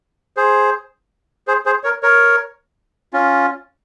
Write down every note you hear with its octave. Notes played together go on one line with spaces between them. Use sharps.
G#4 C5
G#4 C5
G#4 C5
A#4 C#5
A#4 C#5
C#4 F4